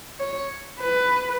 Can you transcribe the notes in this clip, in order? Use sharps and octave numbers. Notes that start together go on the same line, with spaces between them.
C#5
B4